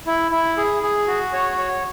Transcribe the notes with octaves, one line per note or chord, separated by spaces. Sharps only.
E4
E4
G#4
G#4
F#4
C#5
C#5